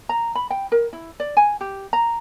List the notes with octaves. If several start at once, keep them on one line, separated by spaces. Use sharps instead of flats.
A#5
B5
G5
A#4
E4
D5
G#5
G4
A#5